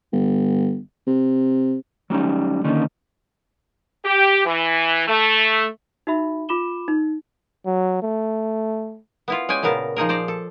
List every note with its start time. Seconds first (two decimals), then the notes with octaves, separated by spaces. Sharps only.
0.13 G1
1.07 C3
2.10 F#3 G3 C#4 D#4
2.64 D3 D#3 A#3 C#4 D#4
4.04 G4
4.46 E3
5.08 A3
6.07 D#4 F#4 E5 B5
6.49 F4 B5 D6 E7 G7
6.88 D#4
7.66 F#3
8.02 A3
9.28 B3 E4 F4
9.49 G#3 C#4 D5 G5 G#5
9.63 A#2 C#3 B3 A#4 A5
9.96 F3 D#4 G#4 A#4
10.09 C5 D5 A#5
10.28 A4